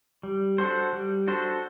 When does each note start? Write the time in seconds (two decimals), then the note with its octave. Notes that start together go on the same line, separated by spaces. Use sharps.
0.23 G3
0.58 D4 F#4 A4 C5
0.93 G3
1.28 D4 F#4 A4 C5